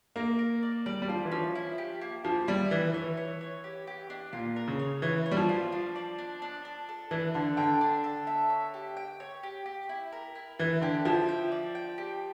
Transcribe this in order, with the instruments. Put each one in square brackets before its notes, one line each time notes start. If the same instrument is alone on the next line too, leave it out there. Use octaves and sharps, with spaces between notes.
[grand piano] A#3 [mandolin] A#4
[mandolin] A#4
D5
[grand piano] G3 [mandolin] D5
[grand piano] G3
[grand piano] F3 [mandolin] F4
[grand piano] E3
[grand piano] F3 [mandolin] C#4
[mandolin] E4
G4
A#3
[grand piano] F3 [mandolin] A#3
[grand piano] G3 [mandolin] E4
[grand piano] E3 [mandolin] E4
[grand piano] E3 [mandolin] C#5
[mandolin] C#5
C#5
G4
G4
D4
[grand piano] A#2 [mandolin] F4
[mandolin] A#4
[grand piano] C#3
[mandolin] C#5
[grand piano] E3 [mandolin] C#5
[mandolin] C#5
[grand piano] G3
F3
[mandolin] F4
D4
D5
D4
D4
D4
A4
[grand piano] E3 [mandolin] D4
[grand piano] D3 [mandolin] A4
[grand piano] D3 [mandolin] G5
[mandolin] D4
A4
E5
C#5
G4
G5
C#5
G4
G4
E4
A#4
E4
[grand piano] E3 [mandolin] E4
[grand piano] D3 [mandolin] G4
[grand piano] F3 [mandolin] E4
[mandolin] G5
D5
G5
G4